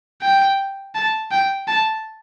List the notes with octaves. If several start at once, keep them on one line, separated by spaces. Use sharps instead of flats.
G5
A5
G5
A5